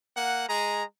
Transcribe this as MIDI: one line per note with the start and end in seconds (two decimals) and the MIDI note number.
0.17 0.47 58
0.17 0.47 78
0.49 0.83 56
0.49 0.83 68
0.49 0.83 82